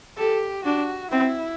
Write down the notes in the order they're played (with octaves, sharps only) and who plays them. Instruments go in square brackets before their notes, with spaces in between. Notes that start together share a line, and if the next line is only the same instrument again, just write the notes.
[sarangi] G4 [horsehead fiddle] A4
[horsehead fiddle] D4 [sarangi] F#4
[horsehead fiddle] C4 [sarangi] E4